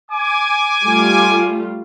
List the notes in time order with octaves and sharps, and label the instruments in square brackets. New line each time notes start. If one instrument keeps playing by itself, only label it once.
[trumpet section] G#5 D6
[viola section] G3 A3 F4